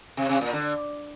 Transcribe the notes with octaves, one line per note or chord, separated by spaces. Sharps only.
C3
C3
A#2
D3